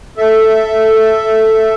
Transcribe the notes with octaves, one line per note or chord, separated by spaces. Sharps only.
A4 E5